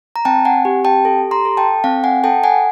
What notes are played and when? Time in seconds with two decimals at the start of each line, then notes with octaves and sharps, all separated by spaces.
0.16 A#5
0.25 C4 G5 A5
0.45 F#5 G#5
0.65 G4
0.85 G5 A5
1.05 A4
1.31 A#5 C6
1.45 A4
1.57 G5 A5
1.84 C4 F5 G5
2.04 F#5 G#5
2.24 A4 G5 A5
2.44 F#5 G#5